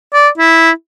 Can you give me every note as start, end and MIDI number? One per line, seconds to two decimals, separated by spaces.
0.14 0.28 74
0.38 0.71 64